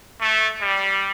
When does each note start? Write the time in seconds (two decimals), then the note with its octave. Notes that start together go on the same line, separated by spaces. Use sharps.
0.19 A3
0.60 G3